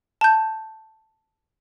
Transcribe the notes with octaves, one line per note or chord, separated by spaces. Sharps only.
A5 G6